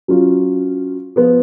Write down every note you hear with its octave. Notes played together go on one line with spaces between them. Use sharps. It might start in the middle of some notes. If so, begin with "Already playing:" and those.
F#3 C#4 F4
F3 B3 F4